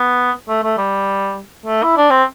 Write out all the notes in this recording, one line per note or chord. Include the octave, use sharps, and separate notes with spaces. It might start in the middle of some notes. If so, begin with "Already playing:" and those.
Already playing: B3
A3
A3
G3
A3
E4
D4
C4